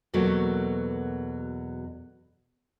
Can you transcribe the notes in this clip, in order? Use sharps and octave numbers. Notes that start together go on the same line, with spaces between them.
E2 B2 F#3 A3 A#3